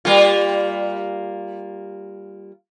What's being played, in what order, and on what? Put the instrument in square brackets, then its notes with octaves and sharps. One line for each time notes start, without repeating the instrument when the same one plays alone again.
[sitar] G3 A#3 F4